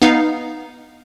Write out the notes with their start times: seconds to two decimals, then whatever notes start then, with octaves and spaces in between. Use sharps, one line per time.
0.02 B3 D#4 F5